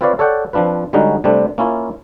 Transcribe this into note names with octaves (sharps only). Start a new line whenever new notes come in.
C4 F4 B4 C#5 D5 F5
A4 C#5 D5 F#5 G5
F3 C4 D4 F4 B4
D3 G3 G#3 C#4 D#4 F#4
C3 G3 A3 C4 D4
A#3 C#4 E4 F4